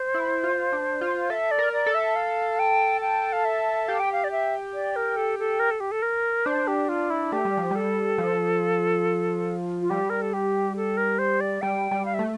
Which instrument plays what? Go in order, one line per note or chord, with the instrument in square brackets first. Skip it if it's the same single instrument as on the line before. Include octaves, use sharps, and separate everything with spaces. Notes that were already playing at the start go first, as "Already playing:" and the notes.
Already playing: [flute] C5
[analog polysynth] E4
F4
D4
F4
[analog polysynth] A4 [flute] E5
[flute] D5
[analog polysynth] A#4
[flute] D5
[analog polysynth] A4
[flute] E5
F5
G5
G5
F5
E5
[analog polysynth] G4 [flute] F5
[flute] G5
F5
D5
E5
D5
A#4
A4
A4
A#4
A4
G4
A4
A#4
[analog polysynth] D4 [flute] C5
[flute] G4
F4
E4
[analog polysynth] A3 [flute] G4
[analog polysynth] G3
F3
[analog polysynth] G3 [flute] A4
[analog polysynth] F3
[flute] F4
[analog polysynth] G3 [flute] G4
[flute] A#4
A4
G4
A4
A#4
C5
D5
[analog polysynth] G3 [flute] G5
[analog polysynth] G3
[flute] F5
E5
[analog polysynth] A3